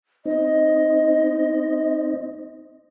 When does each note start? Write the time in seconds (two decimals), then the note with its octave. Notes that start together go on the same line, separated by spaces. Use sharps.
0.26 C4 D#4 D#5